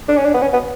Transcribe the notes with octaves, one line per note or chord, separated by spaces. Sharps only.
D4
C#4
D4
B3
C#4
B3